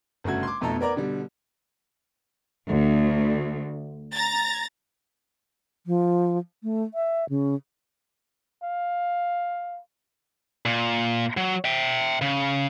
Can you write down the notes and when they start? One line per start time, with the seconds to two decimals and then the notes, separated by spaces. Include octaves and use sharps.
0.24 G1 C#3 A3 F#4 G#6
0.43 C6 D6
0.61 B1 F2 B2 A3 A4 A#5
0.81 B3 A#4 D5 A#5
0.96 B2 D3 G3
2.68 D2
4.14 A#5 A6
5.87 F3
6.63 A3
6.94 E5
7.29 C#3
8.64 F5
10.66 A#2
11.37 F#3
11.65 E5 G5
12.22 C#3